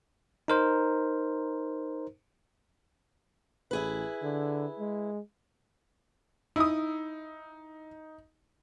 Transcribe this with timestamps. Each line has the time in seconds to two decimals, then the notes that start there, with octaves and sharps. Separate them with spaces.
0.48 D#4 A#4 C5
3.71 A1 E4 G#4 B4
4.23 D3
4.79 G#3
6.56 D#4 E4 D#6